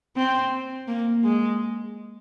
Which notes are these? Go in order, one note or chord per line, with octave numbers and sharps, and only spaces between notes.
C4
A#3
G#3